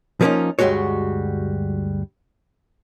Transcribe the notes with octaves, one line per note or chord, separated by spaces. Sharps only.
F3 G3 A#3 B3 C#4 D#4
D2 G2 G3 G#3 F#4 C#5